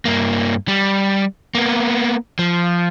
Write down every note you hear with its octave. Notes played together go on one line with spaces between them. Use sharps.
G2 A#3
G3
A#3 B3
F3